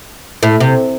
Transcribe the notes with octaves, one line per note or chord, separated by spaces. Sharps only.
A2
C3